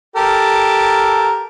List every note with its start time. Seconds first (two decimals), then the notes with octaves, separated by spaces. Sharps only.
0.16 G4 A4 A#4